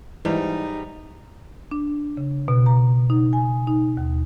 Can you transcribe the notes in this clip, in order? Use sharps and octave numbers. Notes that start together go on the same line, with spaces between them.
G#2 E3 G3 D#4
D4
C#3
B2
A#5
D#4
G#5
D#4
D#2